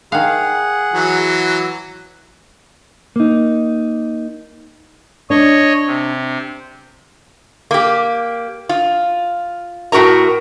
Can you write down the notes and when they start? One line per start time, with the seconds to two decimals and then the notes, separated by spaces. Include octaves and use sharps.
0.12 D#3 G#4 F5 F#5
0.93 E3 F#3
3.16 A#3 D#4
5.30 D4 C#5 D#5
5.86 C3
7.71 A#3 G4
8.69 F4
9.92 A2 F#4 A#4 A#5